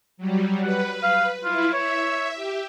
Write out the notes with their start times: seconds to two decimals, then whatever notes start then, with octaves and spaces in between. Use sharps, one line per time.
0.17 F#3 G3
0.63 B4 F#5
1.03 F5
1.44 E4 F4
1.74 C#5 E5
2.35 G4